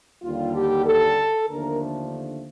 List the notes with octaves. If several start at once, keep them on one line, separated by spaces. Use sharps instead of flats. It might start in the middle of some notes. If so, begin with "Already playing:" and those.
D#2 D3 G3 F4
G4
A4
D#2 D3 F3 A3 D4 A#4